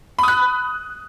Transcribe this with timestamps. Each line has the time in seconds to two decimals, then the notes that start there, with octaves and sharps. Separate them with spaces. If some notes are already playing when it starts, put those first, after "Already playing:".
0.19 B5
0.23 D#6
0.28 F#6